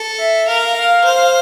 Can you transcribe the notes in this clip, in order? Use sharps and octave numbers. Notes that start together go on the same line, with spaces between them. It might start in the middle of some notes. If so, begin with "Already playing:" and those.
Already playing: A4
E5
A#4 F5
F5
C5